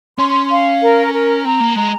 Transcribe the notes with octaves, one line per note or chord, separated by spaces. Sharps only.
C#4 C6
F5
A#4
A#4
C4 A#5
A#3
G#3 A#5